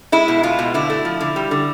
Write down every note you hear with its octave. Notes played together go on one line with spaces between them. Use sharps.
G#3 E4
B2
G#3 F4
B2
D3 E4
A3
F3
D3
G3
D3